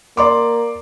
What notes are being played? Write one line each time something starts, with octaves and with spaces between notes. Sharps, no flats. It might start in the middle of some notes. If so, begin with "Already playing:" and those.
A#3 D5 C6 D6